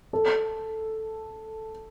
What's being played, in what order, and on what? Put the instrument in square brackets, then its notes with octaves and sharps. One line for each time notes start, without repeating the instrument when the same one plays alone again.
[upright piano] A4